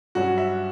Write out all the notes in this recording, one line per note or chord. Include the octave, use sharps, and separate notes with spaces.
G2 F#3 C#4 F#4
E5